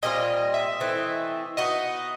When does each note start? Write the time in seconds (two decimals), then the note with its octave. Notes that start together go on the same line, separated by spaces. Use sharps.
0.03 A#2 G3 C4 F4 D#5
0.54 E5
0.80 E3 A3 C4 E4
1.57 B3 D#4 F#4 D#5